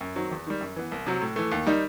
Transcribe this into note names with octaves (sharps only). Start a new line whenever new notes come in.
F#2
D#3 F#3 C4
E2
D#3 G3
F#2
E3 B3
C2
C3 F#3
A2
E3 A3
D#2
D#3 G3 D#4